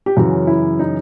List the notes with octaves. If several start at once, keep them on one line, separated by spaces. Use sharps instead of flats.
G4
F#2 C#3 E3 F#4
E4
D#4